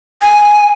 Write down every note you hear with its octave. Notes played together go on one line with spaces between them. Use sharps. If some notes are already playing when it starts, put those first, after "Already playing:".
G#5